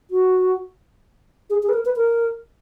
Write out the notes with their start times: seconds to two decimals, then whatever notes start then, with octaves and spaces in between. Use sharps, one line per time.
0.11 F#4
1.50 G#4
1.63 G#4
1.69 B4
1.73 A#4
1.85 B4
1.96 A#4